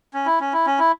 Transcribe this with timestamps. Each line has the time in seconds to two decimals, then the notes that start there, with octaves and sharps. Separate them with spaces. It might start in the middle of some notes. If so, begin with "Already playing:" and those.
0.14 C#4
0.26 E4
0.40 C#4
0.53 E4
0.66 C#4
0.79 E4